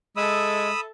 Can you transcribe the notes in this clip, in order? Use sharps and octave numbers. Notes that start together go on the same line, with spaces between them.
G#3 A4 E5 B5 D#6 E6